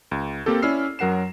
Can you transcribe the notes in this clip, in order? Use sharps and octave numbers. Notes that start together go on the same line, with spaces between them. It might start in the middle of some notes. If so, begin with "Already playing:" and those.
C#2
A#3 C4 G4 A4
C#4 E4 D5 E6 F6 C7
F#2 F#3 A#4 F#5 C7 E7